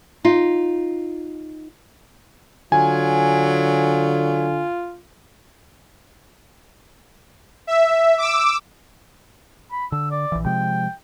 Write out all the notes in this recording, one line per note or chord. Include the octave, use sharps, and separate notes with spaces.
D#4 F4
D3 F#3 F4 G#5
E5
D6 E6
B5
D3 E6
D5
A#1 E3
C3 F3 G#3 G5